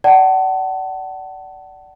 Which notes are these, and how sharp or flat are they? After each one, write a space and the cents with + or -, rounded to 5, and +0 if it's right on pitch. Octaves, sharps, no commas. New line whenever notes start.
D5 +0 F#5 +35 A5 +0